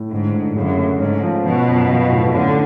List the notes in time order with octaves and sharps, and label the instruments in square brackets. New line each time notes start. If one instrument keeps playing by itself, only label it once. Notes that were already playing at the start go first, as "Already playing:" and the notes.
Already playing: [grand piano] A2
[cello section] G#2 [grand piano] D3
[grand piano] D3
[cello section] F#2 [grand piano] C#3
[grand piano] A3
[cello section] G#2 [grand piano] C#4
[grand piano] F3
[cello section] B2 [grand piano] F3
[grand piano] F#2
F3
A2
[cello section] D3 [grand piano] C#4